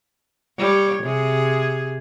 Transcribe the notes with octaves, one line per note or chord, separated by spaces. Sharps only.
G3 C#5
C3 G#4